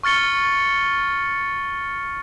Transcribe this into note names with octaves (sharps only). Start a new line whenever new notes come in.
C#6 F6 A6 C#7 G7